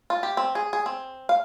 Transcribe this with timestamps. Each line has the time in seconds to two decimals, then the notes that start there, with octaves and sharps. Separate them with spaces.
0.10 F4
0.23 G4
0.37 C4
0.55 G#4
0.73 G#4
0.86 C4
1.29 F5